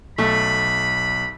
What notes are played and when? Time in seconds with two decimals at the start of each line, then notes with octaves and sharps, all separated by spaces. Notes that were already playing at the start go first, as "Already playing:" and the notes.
0.18 B1 A3 B5